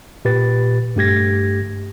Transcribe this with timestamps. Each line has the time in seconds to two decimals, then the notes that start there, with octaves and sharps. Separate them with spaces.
0.25 A#2 G4 B4 A6
0.96 G2 A3 G4 G#6 A#6